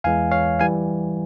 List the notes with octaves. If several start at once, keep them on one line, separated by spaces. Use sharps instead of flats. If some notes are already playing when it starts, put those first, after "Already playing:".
E2 E3 G#3 F5 G#5
C#5 F5
E3 G3 F5 G#5